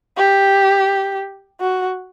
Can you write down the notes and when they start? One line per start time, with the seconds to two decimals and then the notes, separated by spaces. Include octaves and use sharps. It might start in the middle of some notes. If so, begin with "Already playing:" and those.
0.18 G4
1.60 F#4